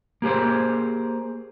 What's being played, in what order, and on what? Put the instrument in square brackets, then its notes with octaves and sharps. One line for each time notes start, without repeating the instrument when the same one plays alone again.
[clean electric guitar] A#3 G4 G#4 C5